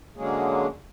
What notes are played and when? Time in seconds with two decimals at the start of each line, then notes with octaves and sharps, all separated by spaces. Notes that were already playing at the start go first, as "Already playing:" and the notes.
0.17 D3 F#3 G#3 A#3 C#4 G#4